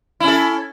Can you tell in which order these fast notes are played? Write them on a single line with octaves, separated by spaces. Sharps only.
E4 C#4 A4